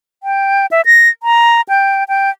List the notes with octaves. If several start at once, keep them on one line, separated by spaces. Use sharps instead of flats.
G5
E5
A#6
A#5
G5
G5